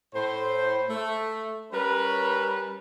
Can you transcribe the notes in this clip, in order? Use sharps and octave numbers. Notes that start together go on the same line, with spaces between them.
A2 C5
A3
G3 C#4 A#4 B4